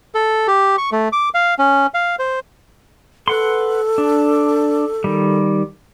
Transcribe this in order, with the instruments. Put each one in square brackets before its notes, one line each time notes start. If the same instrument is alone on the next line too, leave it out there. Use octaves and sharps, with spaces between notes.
[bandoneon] A4
G4
C#6
A3
D6
F5
C#4
F5
C5
[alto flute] A4 [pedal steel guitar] B4 F#5 C6
[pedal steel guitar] D4
D#3 G3